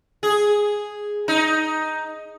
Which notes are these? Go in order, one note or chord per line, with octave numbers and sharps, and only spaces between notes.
G#4
D#4